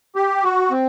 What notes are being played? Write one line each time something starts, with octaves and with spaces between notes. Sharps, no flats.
G4
F#4
C4